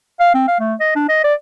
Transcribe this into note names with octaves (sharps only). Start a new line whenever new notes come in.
F5
C4
F5
A3
D#5
D4
D#5
D5